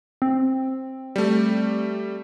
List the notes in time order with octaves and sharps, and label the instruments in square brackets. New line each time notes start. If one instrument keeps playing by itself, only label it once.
[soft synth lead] C4
[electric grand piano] G3 A3